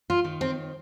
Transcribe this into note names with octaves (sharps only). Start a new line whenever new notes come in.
F4
D#3
C4